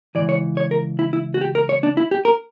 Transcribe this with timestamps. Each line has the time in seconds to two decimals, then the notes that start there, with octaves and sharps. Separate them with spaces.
0.15 C#3 E3 D5
0.19 C#2
0.29 C#5
0.57 C#5
0.71 A#4
0.99 E4
1.13 E4
1.34 F#4
1.41 G4
1.55 A#4
1.69 C#5
1.83 D4
1.97 E4
2.11 G4
2.25 A#4